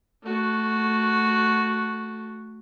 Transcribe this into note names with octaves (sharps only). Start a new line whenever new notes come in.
A3 F#4